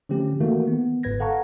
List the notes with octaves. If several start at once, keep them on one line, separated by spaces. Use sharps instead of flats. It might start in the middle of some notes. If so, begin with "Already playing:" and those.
D3 F3 A3 C4 C#4 G4
D#3 E3 A3 A#3 F#4
B3
G1 G#2 B4 G#6 A#6
A4 F5 F#5 A5 A#5 C#6